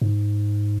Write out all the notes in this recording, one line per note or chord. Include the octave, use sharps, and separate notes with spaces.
G#2